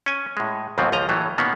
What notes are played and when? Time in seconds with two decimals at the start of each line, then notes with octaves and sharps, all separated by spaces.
0.06 C#4 G#5
0.37 A2 G#3
0.78 D#2 G#2 B2 F3 F#3 C4
0.92 C#2 F3 D#5 A#5
1.09 A2 E3 F#3 A3 A#3
1.38 B2 D#3 A#3 B3 C#4